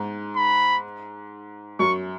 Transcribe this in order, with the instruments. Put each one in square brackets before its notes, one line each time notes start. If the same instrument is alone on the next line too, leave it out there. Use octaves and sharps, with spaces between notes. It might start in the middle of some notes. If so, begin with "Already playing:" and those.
Already playing: [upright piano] G#2
[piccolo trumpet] B5
[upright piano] F#2 [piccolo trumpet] C#6